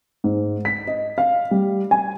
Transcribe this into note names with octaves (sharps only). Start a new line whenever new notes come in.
G#2
B6
D#5
F5
G3
G#5